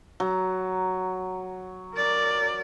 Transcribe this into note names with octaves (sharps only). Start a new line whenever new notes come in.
F#3
A#4 D5